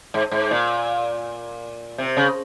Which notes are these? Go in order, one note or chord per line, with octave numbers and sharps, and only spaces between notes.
G#2
G#2
A#2
C3
C#3